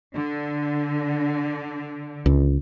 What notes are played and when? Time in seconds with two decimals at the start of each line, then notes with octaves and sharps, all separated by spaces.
0.15 D3
2.26 C#2